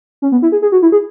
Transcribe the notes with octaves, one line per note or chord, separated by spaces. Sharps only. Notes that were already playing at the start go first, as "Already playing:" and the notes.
C#4
B3
E4
G#4
G#4
F#4
E4
G#4